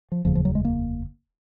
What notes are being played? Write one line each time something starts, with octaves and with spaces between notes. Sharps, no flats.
F3
F1 D#2 C#3 F3
F3
F#3
G#3
A#3